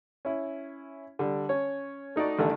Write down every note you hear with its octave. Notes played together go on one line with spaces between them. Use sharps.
C#4 E4
D3 G3
C#4 C#5
A3 D#4 F#4 D5
A1 D3 D#3 G3 A3